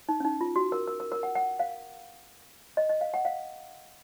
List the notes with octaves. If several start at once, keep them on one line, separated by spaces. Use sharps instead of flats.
D#4
C#4
D#4
F4
F#4
A#4
A#4
A#4
A#4
F#5
F#5
F5
D#5
D#5
F5
F#5
F5